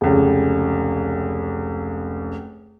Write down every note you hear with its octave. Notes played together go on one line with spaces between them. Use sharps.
F1 C#2